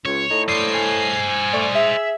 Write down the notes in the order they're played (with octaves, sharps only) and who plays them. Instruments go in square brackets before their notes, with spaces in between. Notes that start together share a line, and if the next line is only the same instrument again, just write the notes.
[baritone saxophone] C#2 [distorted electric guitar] C#5
[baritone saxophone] A2 [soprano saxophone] D#4
[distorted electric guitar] C5 D#5 [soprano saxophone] D5 [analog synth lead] C7
[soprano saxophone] G#5
[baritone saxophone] A3 [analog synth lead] D5
[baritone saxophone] G#4 [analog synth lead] E5